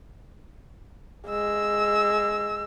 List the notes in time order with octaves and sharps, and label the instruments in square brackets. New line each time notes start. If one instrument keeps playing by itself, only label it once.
[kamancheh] G#3 E6